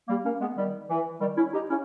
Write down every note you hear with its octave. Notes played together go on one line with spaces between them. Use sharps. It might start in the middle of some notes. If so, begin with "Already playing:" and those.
G3 A#3
A#3 C#4
G#3 B3
D#3 G3
E3
D#3 G3
C#4 E4
D#4 G4
C#4 E4